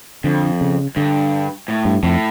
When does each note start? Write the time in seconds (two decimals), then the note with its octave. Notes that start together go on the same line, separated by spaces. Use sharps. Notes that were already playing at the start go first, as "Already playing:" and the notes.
0.24 F2 D3
0.61 C#3
0.96 G2 D3
1.68 A2
1.85 G2
2.03 F2 A2